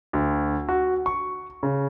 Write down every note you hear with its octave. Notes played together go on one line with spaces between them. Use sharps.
D2
F#4
C#6
C#3